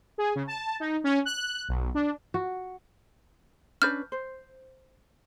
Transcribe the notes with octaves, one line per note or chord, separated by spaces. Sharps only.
G#4
C#3
A5
D#4
C#4
F#6
B1
D4
F#4
C#4 D4 B4 F6 G6
C5